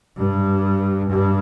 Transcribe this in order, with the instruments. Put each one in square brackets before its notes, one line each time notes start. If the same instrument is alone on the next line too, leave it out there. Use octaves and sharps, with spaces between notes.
[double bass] G2
G2